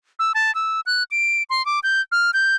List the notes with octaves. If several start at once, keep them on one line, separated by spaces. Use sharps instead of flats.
E6
A5
E6
F#6
D7
C6
D6
G6
F6
G6